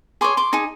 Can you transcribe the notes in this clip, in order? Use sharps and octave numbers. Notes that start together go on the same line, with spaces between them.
G#4 C#5 C6 D6
C6 D6
D#4 G#4